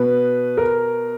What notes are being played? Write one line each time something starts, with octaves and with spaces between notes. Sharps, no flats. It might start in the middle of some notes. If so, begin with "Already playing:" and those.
Already playing: B2 B4
A#4